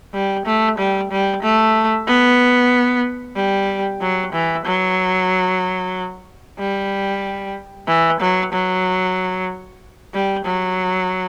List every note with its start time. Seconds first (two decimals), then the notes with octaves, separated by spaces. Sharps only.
0.14 G3
0.46 A3
0.78 G3
1.11 G3
1.42 A3
2.07 B3
3.36 G3
4.01 F#3
4.33 E3
4.66 F#3
6.59 G3
7.88 E3
8.20 F#3
8.52 F#3
10.14 G3
10.45 F#3